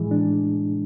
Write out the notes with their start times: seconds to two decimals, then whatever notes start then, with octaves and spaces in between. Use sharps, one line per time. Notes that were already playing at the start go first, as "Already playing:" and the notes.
Already playing: A2 E3 G#3 G#4
0.11 D4